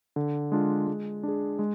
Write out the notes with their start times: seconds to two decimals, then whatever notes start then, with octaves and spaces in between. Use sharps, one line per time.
0.16 D3
0.52 G#3 D4 F4
0.88 G#3
1.23 D4 G#4
1.59 G#3